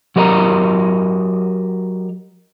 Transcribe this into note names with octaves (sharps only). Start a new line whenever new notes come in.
F#3 G4 A#4 D#5 A#5